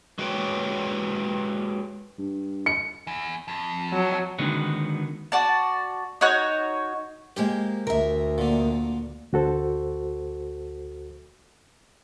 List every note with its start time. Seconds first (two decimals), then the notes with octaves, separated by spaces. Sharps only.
0.19 G#3 F#4 G4 B4 C#5 G5
2.19 G2
2.66 C#7
3.07 E2
3.48 F2
3.93 F#3
4.39 D3 D#3 G#3 B3 F#4
5.32 F#4 D5 A5
6.21 D#4 F#4 C#5 F#6
7.37 G#3 A#3 G4 C5
7.87 D2 A#4 E5
8.38 A#2 D3
9.33 D2 F#4 A4 C5